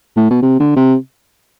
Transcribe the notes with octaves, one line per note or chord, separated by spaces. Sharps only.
A2
B2
C3
D3
C3